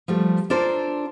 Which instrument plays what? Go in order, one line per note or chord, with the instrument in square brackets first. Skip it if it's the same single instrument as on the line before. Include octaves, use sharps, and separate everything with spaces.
[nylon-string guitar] F3 G3 A3
D4 F4 A4 A#4 C5